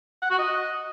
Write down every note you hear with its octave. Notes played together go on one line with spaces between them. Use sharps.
F#5
F#4
D#5